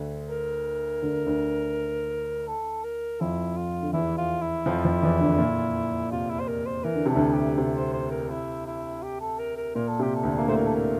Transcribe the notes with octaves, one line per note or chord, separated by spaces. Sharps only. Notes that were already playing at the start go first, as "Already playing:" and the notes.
Already playing: D2 D3
A#4
D2 D3
D2 D3
A4
A#4
F2 F3 E4
F4
D3
E2 E3 E4
F4
E4
F2 F3
F2 F3
E2 E3
D2 D3
A#2
C3 F4
E4
C5
A#4
C5
E3 A#4
D3
C3 A4
D2 D3
G4
C3
C5
C5
A#4
E4
E4
G4
A4
A#4
A#4
A#2 A#4
A4
C3 G4
A4
D2 D3
A#3
A2 A3 C5
A#4
A4
A#4